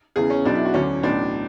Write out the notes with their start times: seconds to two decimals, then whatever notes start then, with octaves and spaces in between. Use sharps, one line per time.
0.16 E2 C#3 E3 G#4
0.30 C#4
0.45 B1 B2 F#3 D4
0.55 E4
0.65 F#4
0.74 D2 D3 F#3 C#4
1.03 B1 A2 E3 D4